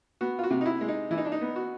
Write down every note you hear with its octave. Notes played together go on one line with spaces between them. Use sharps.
B3 F#4
F4
F#4
C3
D#4
E4
G#3
D#4
E3 E4
D#4
D4
D#4
B3
F#4